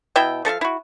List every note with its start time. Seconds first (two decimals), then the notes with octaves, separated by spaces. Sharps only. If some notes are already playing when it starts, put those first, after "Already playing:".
0.16 B2 E4 E5 G5
0.45 F3 A4 E5 F5
0.61 E4 F#4